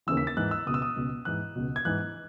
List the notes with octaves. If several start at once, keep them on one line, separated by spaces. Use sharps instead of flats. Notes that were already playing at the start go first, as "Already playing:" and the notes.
D#2 C#3 E3 E6
B6
A6
G#2 E3 F#6
E6
C#2 B2 D#6
E6
D#6
C#2 B2
G#2 E3 F#6
C#2 B2
G#6
G#2 E3 F#6